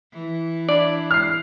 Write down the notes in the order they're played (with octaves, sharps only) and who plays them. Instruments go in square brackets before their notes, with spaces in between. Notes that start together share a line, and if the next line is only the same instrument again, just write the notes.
[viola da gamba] E3
[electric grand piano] D4 E4 B5 [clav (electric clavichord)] D5
[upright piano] F6 C7